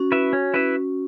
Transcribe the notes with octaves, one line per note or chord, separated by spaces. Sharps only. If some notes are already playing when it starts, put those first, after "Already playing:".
Already playing: C#4 F#4
E4 B4 E5
C#4
E4 B4 E5